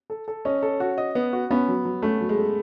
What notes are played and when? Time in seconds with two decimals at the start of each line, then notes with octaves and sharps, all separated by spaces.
0.10 A4
0.28 A4
0.45 C#4 D#5
0.62 A4
0.80 F#4
0.98 D#5
1.15 B3
1.33 F#4
1.51 B3 C#4
1.69 F#3
1.85 F#3
2.02 A3 C#4
2.21 F#3
2.29 G#3
2.38 A4